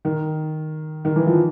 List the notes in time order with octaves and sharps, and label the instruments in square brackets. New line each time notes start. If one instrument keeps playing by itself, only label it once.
[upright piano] D#3
D#3
E3
F3